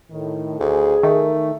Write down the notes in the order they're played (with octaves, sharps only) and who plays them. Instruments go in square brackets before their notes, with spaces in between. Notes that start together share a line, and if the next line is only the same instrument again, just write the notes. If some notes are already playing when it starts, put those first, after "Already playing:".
[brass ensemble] A2 D#3
[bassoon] D2 [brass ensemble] G#4
[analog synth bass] D#3 [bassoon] A3